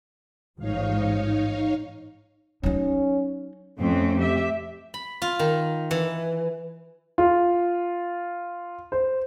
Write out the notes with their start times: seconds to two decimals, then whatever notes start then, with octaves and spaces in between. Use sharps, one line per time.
0.59 A1 G#2 F3 D#4 C#5 F5
2.63 F#3 C#4 D#4
3.80 F2 A3 C4 C#4
4.18 G4 E5
4.94 B5
5.22 F4
5.39 D#3
5.91 E3
7.18 F4
8.92 C5